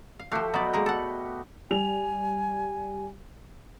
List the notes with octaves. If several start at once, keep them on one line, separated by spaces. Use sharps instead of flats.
F5
F3 A3 F#4 G4 F5
B2 F#3 D5 D#5 B5
G#3 A#3 A#4
A4 F#5
G3 G#5 F7